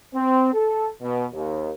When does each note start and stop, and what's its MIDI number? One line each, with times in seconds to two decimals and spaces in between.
0.15 0.53 60
0.53 0.89 69
1.02 1.24 47
1.32 1.71 39